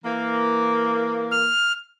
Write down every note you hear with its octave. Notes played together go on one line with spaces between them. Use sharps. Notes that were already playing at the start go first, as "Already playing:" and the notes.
E3 A#3
F6